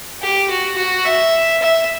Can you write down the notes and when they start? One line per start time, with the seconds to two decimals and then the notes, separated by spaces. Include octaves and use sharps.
0.22 G4
0.50 F#4
0.77 F#4
1.05 E5
1.62 E5